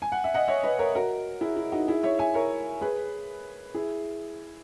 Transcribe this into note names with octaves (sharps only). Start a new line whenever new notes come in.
G#5
F#5
E5
D#5 F#5
C#5 E5
B4 D#5
A#4 C#5
F#4 A#4
E4 G#4
E4
D#4 F#4
E4 G#4
C#5 E5
E5 G#5
A#4 C#5
G#4 B4
E4 G#4